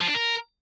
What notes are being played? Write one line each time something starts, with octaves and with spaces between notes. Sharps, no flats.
F3
D4
A#4